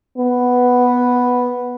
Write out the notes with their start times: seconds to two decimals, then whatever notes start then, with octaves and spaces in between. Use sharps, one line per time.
0.18 B3